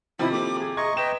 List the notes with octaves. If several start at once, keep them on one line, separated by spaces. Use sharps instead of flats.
C3 D#3 F3 E4 F#4 G4 C5
A#3 G4 A4 D6
G#4
D#5 E5 A#5 C6 C#6 G#6
B4 D#5 G5 E7